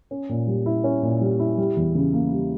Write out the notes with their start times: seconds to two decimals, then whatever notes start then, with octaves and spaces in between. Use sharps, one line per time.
0.11 C#4
0.29 A#2
0.48 G3
0.66 E4
0.84 C#4
1.03 A#2
1.21 G3
1.39 E4
1.58 G3
1.77 E2
1.95 C#3
2.13 A#3
2.32 G3